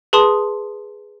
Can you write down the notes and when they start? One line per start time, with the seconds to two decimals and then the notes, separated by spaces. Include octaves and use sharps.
0.13 G#4 B4 A5 C6 D#6